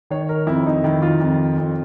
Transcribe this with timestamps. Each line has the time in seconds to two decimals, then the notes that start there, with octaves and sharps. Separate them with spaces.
0.10 D#3 C#5
0.29 A#4
0.47 F2 E4
0.66 D#4
0.84 D#3 E4
1.02 F4
1.20 F2
1.58 F2